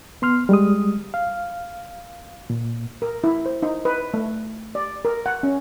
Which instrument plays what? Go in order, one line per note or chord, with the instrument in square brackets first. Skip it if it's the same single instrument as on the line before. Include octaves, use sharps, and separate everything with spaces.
[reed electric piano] B3 C6 F6
G3 G#3 D#6
F5
A#2
[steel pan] A#4
E4
C5
D#4
B4
A3
D5
A#4
F#5
C#4